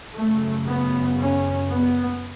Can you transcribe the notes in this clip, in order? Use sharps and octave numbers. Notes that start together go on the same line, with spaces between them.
F#2 C#3 A3
B3
C#4
B3